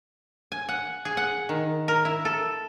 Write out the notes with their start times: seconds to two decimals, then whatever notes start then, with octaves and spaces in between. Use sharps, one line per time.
0.52 G#5
0.69 F#5
1.05 G#4
1.17 F#5
1.49 D#3
1.88 A#4
2.05 E4
2.25 A4